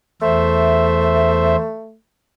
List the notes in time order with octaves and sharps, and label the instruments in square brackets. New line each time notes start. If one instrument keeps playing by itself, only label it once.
[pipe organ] E2 C5 E5 [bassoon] A3